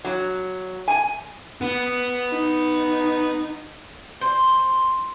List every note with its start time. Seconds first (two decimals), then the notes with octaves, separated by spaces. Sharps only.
0.05 F#3
0.88 G#5
1.61 B3
2.30 D#4
4.21 C5